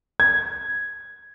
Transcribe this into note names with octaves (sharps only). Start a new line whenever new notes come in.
G#6